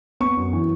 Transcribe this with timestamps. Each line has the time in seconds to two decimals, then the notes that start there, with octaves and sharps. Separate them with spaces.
0.20 B3 C#6
0.37 F#2
0.53 E3